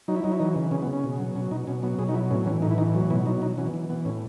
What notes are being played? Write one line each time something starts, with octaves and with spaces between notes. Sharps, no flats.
F#3 D#4
E4
F#3 D#4
E4
E3 D#4
C#3
C#3 C#4
B3
C#3
C#4
B2
F#3
B2 C#4
B2 D#4
B2 C#4
F#3 B3
B2 G#4
D#4
F#3 E4
A2 C#4
E3 C#4
A2 D#4
E4
E3 D#4
F#3
B2 E4
F#3 D#4
B2 D#4
E3 C#4
E3
E3 B3
A2 C#4